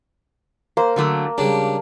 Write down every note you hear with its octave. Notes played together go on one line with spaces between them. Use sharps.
A#3 C5
D3 F#3 A3
C#3 G3 G#3 D4